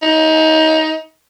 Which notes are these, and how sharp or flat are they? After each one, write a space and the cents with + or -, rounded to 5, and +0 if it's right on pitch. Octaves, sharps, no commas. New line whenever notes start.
D#4 +25